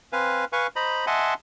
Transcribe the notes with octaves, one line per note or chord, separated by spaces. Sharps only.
C4 B4 F5 G#5
B4 F5 G#5 C#6
C5 D#5 A#5 B5
D#5 E5 F#5 G#5 A5 C6